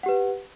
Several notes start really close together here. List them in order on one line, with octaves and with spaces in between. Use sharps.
F#5 G4 B4